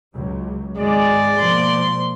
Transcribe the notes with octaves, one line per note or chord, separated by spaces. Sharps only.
C#2 F#3
G#1 G#3 D5
B2 F3 A#3 C6